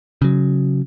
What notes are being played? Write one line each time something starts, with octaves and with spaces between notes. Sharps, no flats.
C#3 F#3